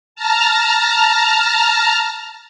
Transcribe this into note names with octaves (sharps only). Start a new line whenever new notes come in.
A5 A#5 F6